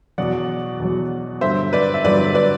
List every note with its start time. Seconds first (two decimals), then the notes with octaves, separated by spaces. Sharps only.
0.18 E2 B2 F#3 D5 F#5
0.80 E2 B2 F#3
1.41 G2 D3 F#3 C5 E5
1.73 B4 D5
1.94 E5
2.04 G2 D3 F#3 B4 D5
2.35 B4 D5